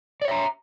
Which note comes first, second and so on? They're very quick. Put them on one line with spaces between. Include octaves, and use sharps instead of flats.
D5 C#5 E5 A#5